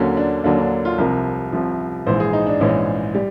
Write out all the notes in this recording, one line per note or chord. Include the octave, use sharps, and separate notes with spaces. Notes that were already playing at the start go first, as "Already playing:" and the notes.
Already playing: D#2 D3 F#3 A#3 C#4
D4
D#2 D3 F#3 A#3 D4
D4
F4
C2 C3 F3 A#4
C2 C3 F3
A#1 G#2 E3 C5
G#4
D#4
D4
A#1 G#2 E3 C#4
G3